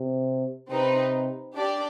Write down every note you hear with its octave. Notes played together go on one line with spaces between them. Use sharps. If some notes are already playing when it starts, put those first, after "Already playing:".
Already playing: C3
C3 C4 D#4 B4
D4 G4 D5